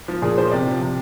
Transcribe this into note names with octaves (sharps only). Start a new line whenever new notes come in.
F3
A#2 G#4
F3 C5
C3 D5
F3
C3